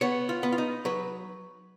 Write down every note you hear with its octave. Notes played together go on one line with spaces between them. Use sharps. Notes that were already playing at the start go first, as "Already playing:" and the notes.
B3 C#5
F4
B3
F4
D#4
F#3 B4